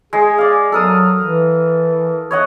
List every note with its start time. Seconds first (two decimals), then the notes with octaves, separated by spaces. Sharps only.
0.13 G#3 G#4
0.38 D5 F5
0.72 F#3 A4 A#4 D#6
1.21 E3
2.31 C#5 D#5 F#5